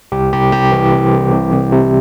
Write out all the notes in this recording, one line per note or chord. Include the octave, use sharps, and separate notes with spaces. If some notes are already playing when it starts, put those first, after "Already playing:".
C2 G4
C2 G4
C2 G4
E3
C2
C2
C3
C2
C3